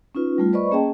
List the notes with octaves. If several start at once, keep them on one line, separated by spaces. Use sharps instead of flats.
C#4 D#4 F4 B4
G3 A3 F4
B4 C5 D5 D#5 B5 C#6
A#3 C#4 G#4 D#5 G5 A5